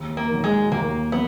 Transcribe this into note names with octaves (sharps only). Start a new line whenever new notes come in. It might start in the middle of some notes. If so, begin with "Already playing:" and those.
Already playing: D#2
A#3
D#3 F#3
G#3
D#2 A#3
F#3 B3